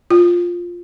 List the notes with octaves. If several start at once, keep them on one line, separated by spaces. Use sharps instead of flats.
F4